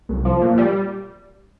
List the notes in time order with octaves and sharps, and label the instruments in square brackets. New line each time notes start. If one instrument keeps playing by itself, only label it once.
[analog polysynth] C2
F3
A#2
G3